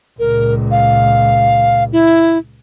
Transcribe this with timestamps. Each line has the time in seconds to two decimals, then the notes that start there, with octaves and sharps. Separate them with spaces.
0.19 C#2 A#2 A#4
0.71 F5
1.93 E4